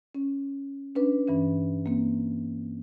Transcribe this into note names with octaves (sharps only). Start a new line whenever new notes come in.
C#4
C#4 D4 B4
G2 E3 C#4
A#3 C4